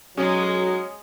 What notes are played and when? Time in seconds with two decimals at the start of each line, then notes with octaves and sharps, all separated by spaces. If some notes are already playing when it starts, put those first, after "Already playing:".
0.17 B1 F#3 G#3 C#4 G#4